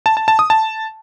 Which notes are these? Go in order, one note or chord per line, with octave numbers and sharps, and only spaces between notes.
A5
A5
A5
D#6
A5